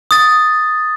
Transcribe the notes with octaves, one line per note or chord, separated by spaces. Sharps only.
D#6 A6